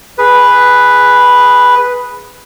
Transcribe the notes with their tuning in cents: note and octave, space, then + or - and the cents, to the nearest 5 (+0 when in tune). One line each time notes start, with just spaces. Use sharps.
G#4 +0 B4 +0